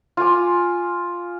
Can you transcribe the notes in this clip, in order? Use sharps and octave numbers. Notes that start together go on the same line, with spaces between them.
F4 F5 G#5 D6